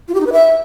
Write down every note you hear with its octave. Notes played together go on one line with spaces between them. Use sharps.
F4
G4
D#4
B4
E5